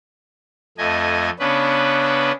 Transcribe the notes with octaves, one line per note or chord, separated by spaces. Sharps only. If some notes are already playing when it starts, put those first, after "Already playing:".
F2 A3 D#5 G#5
C#3 B3 C#4 D4 B4